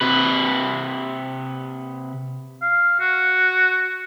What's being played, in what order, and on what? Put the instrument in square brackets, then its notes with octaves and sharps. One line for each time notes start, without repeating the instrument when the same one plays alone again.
[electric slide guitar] C3 B4
[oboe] F5
F#4